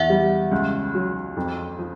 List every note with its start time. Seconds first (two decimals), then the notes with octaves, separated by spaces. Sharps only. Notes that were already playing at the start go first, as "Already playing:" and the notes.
Already playing: E2 E5 F#5
0.10 G3
0.51 C#2
0.94 F#3
1.37 F2
1.79 F3